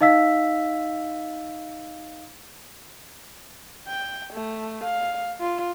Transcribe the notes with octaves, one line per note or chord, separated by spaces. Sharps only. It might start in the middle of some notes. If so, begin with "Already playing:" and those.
D#4 D#5 F5 E6 B6
G5
A3
F5
F4